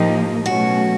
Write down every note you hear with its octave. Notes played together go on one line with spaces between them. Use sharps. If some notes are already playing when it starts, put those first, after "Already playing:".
Already playing: A2 F3 A#3 D#4 G4
B2 F#3 A3 C#4 F#4